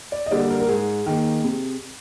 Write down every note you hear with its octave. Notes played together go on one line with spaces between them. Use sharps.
D5
D#5
D3 G3 A#3 D5
A#4
A#4
G#2 G#4
D#3 A#3
C3